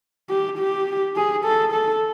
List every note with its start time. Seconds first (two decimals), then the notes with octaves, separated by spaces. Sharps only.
0.30 G4
0.59 G4
1.16 G#4
1.45 A4
1.73 A4